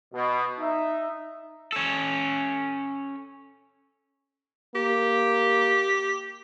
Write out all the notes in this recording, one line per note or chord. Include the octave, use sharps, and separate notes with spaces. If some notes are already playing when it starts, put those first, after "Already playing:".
B2
D#4 E5
C#4 A4
A#3 G4